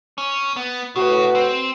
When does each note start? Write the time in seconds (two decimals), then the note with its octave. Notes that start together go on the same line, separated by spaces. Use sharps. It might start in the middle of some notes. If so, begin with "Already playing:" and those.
0.18 C#4
0.56 B3
0.96 A2 C#3 F#4 B4
1.35 C4